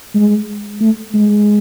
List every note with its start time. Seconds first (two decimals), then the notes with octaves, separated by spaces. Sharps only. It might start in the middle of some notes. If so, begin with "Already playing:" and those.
0.15 G#3
0.81 A3
1.14 G#3